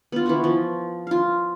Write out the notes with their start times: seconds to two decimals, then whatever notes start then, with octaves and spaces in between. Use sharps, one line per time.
0.12 B3 F4
0.26 E3 B3 F#4
0.44 F3
1.07 F4 F5